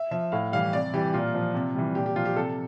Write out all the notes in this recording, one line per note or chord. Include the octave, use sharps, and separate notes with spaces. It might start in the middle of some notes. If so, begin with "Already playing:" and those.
Already playing: E5
F3 E5
A2 F5
E3 G3 F5
C3 D5
E3 G3 G4
A#2 F4
F3
C3
E3 G3
A#2 G4
G4
F3 F4
G4
C3 A4